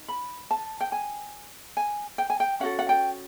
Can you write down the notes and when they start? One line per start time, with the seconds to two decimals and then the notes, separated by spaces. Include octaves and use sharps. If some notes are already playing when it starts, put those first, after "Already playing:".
Already playing: D#4
0.08 B5
0.51 A5
0.81 G5
0.92 G#5
1.77 G#5
2.18 G5
2.30 G#5
2.40 G5
2.60 C#4 F#4 A4 F#5
2.79 F#5
2.89 G5